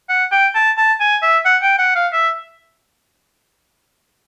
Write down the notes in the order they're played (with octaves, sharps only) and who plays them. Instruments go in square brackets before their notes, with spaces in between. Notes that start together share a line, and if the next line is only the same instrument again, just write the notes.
[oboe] F#5
G5
A5
A5
G#5
E5
F#5
G5
F#5
F5
E5